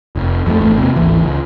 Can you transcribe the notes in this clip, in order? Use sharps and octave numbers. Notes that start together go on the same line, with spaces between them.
F1
F2 F#3 A3
G#1 E2 A3
C3 A#3
D1 G#1 E3
C#2